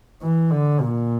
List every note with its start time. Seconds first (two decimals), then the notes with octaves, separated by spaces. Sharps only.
0.22 E3
0.51 D3
0.80 A#2